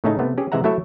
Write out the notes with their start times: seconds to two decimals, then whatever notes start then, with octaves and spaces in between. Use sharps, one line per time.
0.04 A2 C#3 A3 C#4 D#4
0.19 C3 A3 B3
0.38 C#4 G4 G#4
0.52 C3 E3 G#3 E5 F#5 A#5
0.64 F#3 A3 E4 A4 C#5 E5